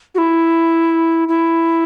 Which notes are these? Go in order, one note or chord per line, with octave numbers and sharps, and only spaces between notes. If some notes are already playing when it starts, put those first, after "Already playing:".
F#4
E4
E4